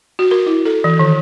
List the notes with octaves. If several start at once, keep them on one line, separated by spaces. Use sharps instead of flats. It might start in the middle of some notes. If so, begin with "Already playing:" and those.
F#4
A#4
E4
A4
E3
D#3